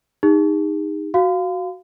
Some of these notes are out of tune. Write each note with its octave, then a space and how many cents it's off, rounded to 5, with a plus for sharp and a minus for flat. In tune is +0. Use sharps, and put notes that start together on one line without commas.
D#4 +0 G#4 -45
F#4 +0 F5 +0 C6 -45